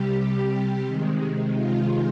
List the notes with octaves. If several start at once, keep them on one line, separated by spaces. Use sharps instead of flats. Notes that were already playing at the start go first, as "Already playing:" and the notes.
Already playing: C3 G3 G4
C3 D#3 G#3
F4